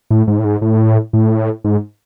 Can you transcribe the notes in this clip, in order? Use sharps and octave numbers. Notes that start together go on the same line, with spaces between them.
A2
G#2
A2
G#2
A2
A2
G#2